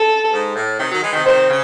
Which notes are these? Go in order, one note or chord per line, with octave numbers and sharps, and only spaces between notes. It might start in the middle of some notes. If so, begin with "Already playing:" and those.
Already playing: A4
G#2
A2
C3 D#3
D#3 F#3
E3 G#3
C3 D#3
C3 D#3 C5
C#3